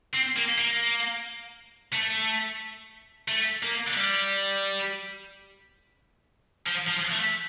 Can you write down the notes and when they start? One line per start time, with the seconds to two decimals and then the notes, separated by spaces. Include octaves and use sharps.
0.14 C4
0.37 A#3
0.58 A#3
1.93 A3
3.28 A3
3.63 A#3
3.97 G3
6.67 F3
6.88 F3
7.12 A3